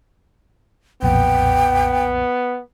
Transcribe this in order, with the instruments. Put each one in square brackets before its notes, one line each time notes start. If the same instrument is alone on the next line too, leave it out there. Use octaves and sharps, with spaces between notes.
[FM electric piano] B1 F2 A#2 [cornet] B3 [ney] G5